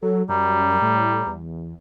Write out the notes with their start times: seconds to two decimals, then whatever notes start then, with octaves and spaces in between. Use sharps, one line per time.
0.03 F#3 A4
0.29 F#2 G3 A#5
0.82 A2
1.27 E2